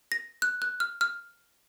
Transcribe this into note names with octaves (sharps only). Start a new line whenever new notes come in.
A#6
F#6
F#6
F6
F6